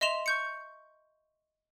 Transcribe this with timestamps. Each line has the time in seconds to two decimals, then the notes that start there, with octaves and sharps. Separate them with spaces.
0.01 D#5 E5 C6 E7 F7
0.26 C#6 G6 C#7